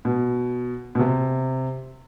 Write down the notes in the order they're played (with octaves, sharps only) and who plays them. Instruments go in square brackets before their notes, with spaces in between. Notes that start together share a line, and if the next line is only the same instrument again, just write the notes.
[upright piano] B2
B2
C3